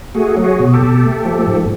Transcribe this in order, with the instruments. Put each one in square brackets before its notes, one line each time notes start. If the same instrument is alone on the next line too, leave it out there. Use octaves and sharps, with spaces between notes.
[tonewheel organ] A3 F#4 G#4
F#3
F#4 G#4
B2
G4 A4
B2
A3
F3
G#2